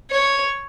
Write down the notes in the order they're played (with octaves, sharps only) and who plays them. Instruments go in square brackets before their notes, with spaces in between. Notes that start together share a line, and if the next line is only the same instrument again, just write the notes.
[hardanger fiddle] C#5